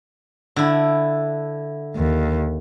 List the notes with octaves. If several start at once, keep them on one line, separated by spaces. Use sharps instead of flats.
D3 E4
D#2